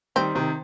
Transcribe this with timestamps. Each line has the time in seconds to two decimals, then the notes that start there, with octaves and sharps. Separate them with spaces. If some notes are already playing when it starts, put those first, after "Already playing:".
0.16 D#3 G3 C4
0.35 C3 D#3